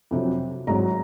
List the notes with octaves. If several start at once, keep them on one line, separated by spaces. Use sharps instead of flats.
F2 C3 F#3
G#1 G#2 F#3 A#5